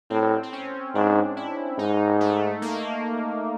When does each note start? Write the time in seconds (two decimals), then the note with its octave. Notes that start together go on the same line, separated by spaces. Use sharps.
0.10 A2 C4
0.43 C4
0.53 C#4
0.94 G#2 D4
1.37 E4
1.78 G#2 D#4
2.21 A3
2.62 A#3